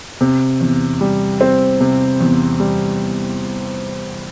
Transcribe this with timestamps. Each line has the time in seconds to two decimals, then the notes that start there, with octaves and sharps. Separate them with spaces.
0.21 C3
0.61 E2
1.01 G3
1.41 C4
1.81 C3
2.21 E2
2.60 G3